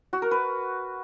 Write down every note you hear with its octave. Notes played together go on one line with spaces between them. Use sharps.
F#4
A#4
B4